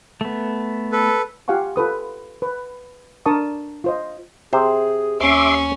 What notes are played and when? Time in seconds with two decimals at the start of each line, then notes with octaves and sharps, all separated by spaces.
0.21 A3 B3
0.92 A4 B4
1.48 F4 G4 F5 F#5 G#5 C#6
1.76 F4 A4 B4 D#6
2.42 B4
3.26 D4 A#4 D5 A5 C#6 D#6
3.84 F4 C5 D#5
4.53 C3 G#4 C5
5.20 D#2 C#4 E5 C6 D6